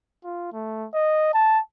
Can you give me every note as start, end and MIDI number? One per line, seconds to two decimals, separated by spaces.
0.24 0.52 65
0.53 0.87 57
0.94 1.29 75
1.34 1.59 81